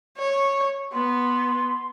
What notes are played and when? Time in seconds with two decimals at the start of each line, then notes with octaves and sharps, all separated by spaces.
0.18 C#5
0.93 B3 C6